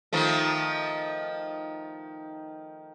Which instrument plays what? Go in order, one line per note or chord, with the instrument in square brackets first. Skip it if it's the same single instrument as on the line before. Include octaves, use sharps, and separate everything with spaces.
[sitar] D#3 F3 A3